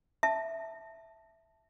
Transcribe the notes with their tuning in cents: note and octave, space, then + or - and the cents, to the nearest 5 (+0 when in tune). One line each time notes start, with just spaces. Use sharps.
E5 +0 A5 +0